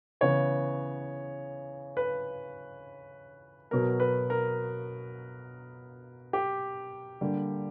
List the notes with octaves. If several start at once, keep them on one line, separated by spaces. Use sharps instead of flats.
C#3 E3 B3 C#5
B4
B2 F#3 B3 A#4
B4
A#4
G4
D3 G3 A#3